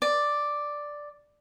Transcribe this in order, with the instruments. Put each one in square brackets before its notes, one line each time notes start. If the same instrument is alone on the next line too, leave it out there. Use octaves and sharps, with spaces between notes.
[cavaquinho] D5